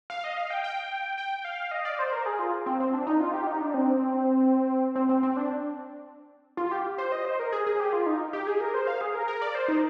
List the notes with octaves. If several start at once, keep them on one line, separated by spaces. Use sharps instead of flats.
F5
D#5
F5
G5
G5
G5
F5
D#5
D5
C5
A#4
G#4
F4
C4
C4
D4
D#4
F4
G4
D#4
D4
C4
C4
C4
C4
D4
F4
G4
C5
D#5
C5
A#4
G#4
G#4
G4
F4
D#4
G4
G#4
A#4
C5
F5
G#4
A#4
A#4
D5
C5
D#4